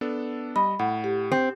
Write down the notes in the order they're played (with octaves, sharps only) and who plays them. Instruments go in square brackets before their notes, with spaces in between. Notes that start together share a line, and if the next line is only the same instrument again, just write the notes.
[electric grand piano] B3 D4 A4
[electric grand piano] G3 D#5 [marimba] B5
[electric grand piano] A2 [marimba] F#5
[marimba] G4
[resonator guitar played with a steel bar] C4